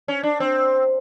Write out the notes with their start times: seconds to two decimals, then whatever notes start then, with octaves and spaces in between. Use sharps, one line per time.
0.08 C#4
0.23 D4
0.40 C4